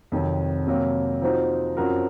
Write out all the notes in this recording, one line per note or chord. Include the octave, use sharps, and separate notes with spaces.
F2 C3 D#3 F#3
C3 F#3 A#3
F3 C4 D#4 F#4
F#2 F3 C4 F#4 A#4